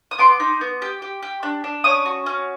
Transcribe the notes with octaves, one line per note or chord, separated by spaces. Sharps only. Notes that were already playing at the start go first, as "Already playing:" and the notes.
D#6
B3 C6 D6
D#4
B3
G4
G4
G4
D4
D4
C#4 C#6 D#6
F#4
C#4